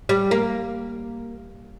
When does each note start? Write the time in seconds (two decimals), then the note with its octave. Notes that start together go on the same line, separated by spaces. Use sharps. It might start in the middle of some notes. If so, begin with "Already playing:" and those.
0.09 G3
0.31 A#3